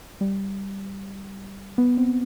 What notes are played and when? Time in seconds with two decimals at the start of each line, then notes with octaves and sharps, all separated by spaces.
0.21 G3
1.78 B3
1.97 C4